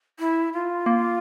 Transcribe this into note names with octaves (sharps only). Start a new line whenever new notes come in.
E4
F4
A#3